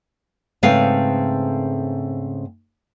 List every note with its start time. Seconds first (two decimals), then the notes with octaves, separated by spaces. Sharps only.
0.63 G#2 C#3 A3 C4 B4 F5